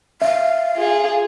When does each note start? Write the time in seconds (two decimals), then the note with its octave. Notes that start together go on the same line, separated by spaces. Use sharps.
0.22 E5 F5
0.76 F4 G#4